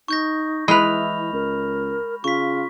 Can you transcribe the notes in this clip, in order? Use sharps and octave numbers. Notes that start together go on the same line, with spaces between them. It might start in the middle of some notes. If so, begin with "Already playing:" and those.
D#4 C#6 G6 A#6
E3 G#3 E4 B4 B5 F6 F7
C#2 A#4
C#3 F4 C#6 B6